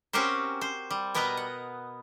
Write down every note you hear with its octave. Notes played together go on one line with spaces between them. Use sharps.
C4 C#4 F#4 G4 A#4 C5
C5
G3
B2 B3 A#4 B4 D#5 A#5
F#5